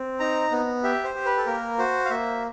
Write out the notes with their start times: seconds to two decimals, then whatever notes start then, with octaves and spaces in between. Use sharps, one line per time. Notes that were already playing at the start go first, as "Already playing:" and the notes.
Already playing: C4
0.20 D#4 A#5
0.51 B3
0.83 G4 E5
1.04 C5
1.15 G4
1.25 B4
1.37 A4
1.46 A#3 A#4
1.78 F#4 C5
2.05 F5
2.10 A#3 E5